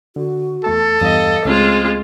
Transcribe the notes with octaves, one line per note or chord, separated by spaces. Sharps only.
D3 F#4
E2 A3 A4 A5
E2 G2 E3 D#5 F5
C#2 G#3 A3 C4 C#4 F4